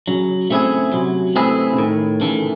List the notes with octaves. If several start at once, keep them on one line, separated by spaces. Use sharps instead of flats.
C#3 F#3
C#3 A3 C4 E4 G#4
C3 F#3
E3 A3 C4 E4 G#4
C#3
A2 D#3
C#3 E3 A3